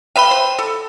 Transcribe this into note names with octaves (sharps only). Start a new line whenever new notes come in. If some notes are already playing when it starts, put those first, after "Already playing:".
B4 E5 F5 G5 B5
C5
A4